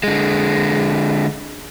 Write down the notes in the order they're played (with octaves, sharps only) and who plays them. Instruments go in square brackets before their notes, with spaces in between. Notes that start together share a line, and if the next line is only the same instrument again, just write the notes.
[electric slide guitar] D3 G#3